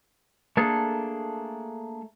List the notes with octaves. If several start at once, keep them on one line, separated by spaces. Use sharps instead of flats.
A3 A#3 D4 G#4 A4